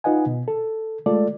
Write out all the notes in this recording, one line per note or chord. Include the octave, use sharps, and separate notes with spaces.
D#4 F4 B4 D#5 F#5 G#5
B2
A4
G#3 A3 F4 A4 D5